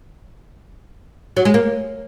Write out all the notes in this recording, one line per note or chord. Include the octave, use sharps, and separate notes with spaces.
F#3
G#3
A#3